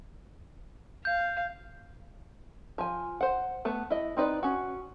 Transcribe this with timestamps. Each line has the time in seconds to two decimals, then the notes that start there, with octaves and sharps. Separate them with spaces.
1.05 F5 G6
2.78 F3 G#5
3.21 C5 F#5
3.65 A3 B3 A5
3.90 E4 D#5
4.17 C4 D#4 B4 D5
4.43 C#4 F#4